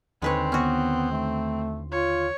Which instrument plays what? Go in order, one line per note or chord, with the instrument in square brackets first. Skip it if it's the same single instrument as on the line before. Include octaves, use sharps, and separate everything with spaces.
[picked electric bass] D#2 D3 D#3 [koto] G#3 B4 C#5 [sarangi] C4
[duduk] B3 [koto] C#4 F#4
[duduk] A3
[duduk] F4 [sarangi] C#5